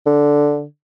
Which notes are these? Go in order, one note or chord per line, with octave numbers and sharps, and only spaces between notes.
D3